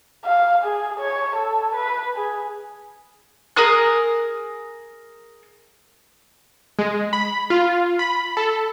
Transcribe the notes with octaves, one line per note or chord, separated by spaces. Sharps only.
F5
G#4
C#5
A4
B4
G#4
G#4 A#4 D#6 F#6
G#3
B5
F4
B5
A4